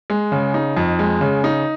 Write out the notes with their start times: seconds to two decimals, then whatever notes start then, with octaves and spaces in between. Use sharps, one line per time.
0.10 G#3
0.32 C#3
0.54 D#4
0.77 F2
0.99 G#3
1.21 C#3
1.44 D#4